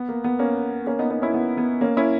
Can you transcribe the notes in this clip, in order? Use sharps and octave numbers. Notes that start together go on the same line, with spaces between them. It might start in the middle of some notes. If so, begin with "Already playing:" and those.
Already playing: B3
A#3
B3
A#3 C#4
A#3 C#4
B3 D#4
B3 D#4
C#4 E4
B3
B3
A#3 C#4
C#4 E4